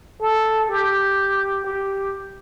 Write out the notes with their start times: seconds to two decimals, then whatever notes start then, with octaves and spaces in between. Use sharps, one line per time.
0.21 A4
0.69 G4
1.64 G4